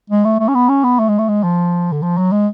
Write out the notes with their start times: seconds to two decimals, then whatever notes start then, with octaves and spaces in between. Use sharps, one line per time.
0.10 G#3
0.25 A3
0.39 A3
0.48 C#4
0.55 B3
0.69 C#4
0.84 B3
0.99 A3
1.08 G#3
1.18 A3
1.28 G#3
1.43 F3
1.92 D3
2.02 F3
2.18 F#3
2.32 G#3